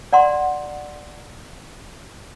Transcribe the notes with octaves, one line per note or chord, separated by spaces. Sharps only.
D5 F#5 A#5 C6